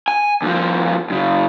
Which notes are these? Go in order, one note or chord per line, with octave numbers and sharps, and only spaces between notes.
G#5
D#2 F3
F#2 C#3